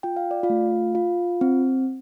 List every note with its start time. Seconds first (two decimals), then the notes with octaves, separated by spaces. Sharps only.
0.03 F4 G5
0.17 F5
0.31 D5
0.43 F4 F5
0.50 A3
0.95 F4
1.41 C4